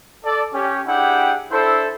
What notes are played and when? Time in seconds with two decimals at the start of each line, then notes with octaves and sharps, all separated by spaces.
0.25 A4 D5
0.54 C#4 G4
0.88 D4 E4 G4 G#4 F#5 G5
1.52 D4 E4 A4 C5